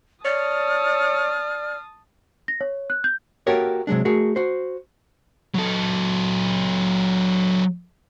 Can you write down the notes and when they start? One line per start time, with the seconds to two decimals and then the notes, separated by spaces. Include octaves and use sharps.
0.25 C#5 D5 A5 D#6 F6
2.48 A#6
2.61 C#5
2.90 F#6
3.04 G6
3.47 A#3 F#4 G4 A4 A#4 C#5
3.87 C3 F#3 G#3 D4
4.05 A3 F#4 G#4 A#4
4.36 F#4 C5
5.55 F#3 A4